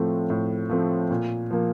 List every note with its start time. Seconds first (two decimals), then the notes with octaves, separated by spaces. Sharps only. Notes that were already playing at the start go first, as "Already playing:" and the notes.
Already playing: A2 F3 A3 C4
0.30 A2
0.69 F3 A3 C4
1.11 A#2
1.51 F3 A#3